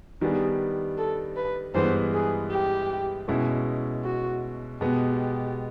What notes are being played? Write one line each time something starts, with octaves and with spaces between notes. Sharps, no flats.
D#3 G3 B3 D4 G#4
A4
B4
G2 E3 G#3 B3 C5
G#4
G4
B2 G#3 C#4 E4
F#4
B2 G#3 B3 G4